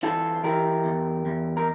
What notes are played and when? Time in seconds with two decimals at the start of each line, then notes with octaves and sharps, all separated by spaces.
0.03 E3 F4 A4
0.44 E3 G4 A#4
0.85 E2
1.26 E2
1.57 A#4